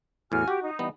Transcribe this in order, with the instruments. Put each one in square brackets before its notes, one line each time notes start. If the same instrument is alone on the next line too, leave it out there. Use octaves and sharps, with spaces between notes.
[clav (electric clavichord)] E2 A2 [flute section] F#4 G#5 F6
[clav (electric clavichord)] F#4 [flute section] G4
[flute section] D#4
[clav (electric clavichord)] E3 G3 B3